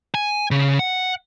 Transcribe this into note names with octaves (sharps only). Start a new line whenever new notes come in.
G#5
C#3
F#5